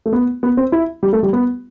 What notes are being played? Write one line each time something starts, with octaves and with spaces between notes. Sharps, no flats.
A3
B3
B3
C4
E4
G3
A3
G3
B3